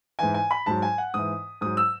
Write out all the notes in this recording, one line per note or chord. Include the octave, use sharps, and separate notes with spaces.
G#2 E3 G#5
G#5
B5
G#2 F#3 A5
G#5
F#5
G#2 E3 D#6
G#2 F#3 D#6
E6